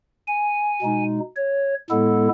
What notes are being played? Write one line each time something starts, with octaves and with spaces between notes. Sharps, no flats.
G#5
B2 G#3 D#4
C#5
A2 G#3 B3 E4 A4